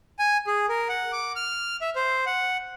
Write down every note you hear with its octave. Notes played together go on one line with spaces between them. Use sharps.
G#5
G#4
A#4
F#5
D6
F6
E5
C5
F#5